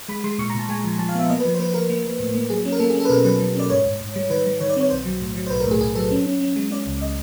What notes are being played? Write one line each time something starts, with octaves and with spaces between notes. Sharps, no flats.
G#3 B5
G#3 C6
A#2 C#6
A#5
A#2 A5
G#3 G#5
F3
F3 A5
F5
B3 E5
A#3 D#5
B4
F3
C5
A#3 B4
A#3 A#4
A#3
A#3
A2
A#3
F#3 G#4
C#4
A#4
A#3 A4
G#4
C#4
A4
B4
B2 A#4
F#3 B4
F#3
C#4 D5
G#2 C#5
G#2
G#2
G3
D#3 B4
G3
D#3 C#5
D5
C4 C#5
B1 C5
F#3
A2
F#3
C5
B1 B4
A#4
A2 G#4
B1 G#4
F#3 A4
C#4
C#4
C#4
G#3
C#4 D5
C#2
D#5